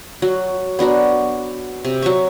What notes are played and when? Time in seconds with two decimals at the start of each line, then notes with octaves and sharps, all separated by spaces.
0.22 F#3 F#4
0.79 B3 D4 F#4 A#4
1.85 C3
2.02 F#3 E5 C#6